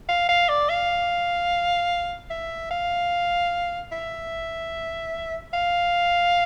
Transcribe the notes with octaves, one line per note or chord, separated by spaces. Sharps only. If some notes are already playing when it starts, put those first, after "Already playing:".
F5
F5
D5
F5
E5
F5
E5
F5